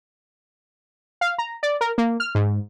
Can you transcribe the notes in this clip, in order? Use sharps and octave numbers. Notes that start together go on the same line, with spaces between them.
F5
A#5
D5
A#4
A#3
F6
G#2